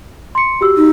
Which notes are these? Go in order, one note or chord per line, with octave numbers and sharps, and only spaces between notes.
C6 C#7
F#4 G4 E6
D#4